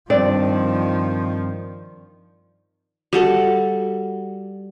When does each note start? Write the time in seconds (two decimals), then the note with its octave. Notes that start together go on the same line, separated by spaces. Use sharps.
0.10 G2 D#3 F3 C4 D5
3.13 G3 F#4 A4